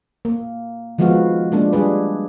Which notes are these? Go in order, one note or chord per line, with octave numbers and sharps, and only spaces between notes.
A#3
D#3 F3 G#3 B3 F#4 F5
G#3 A#3 D4 F4
G3 D4 G#4 B4